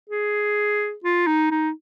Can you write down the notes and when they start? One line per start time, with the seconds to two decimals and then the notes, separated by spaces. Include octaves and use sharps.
0.10 G#4
1.04 F4
1.27 D#4
1.51 D#4